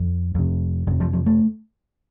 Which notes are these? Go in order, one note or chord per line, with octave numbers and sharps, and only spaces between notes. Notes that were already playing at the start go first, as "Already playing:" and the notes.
Already playing: F2
F2 C3
F2 C3 D#3
F3
F3
A3